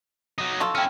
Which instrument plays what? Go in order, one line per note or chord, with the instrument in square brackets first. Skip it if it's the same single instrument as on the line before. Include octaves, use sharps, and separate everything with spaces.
[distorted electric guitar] F#3 D#4
[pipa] F4 A4 [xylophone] C#6
[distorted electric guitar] C#4 E4 [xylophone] G5 F6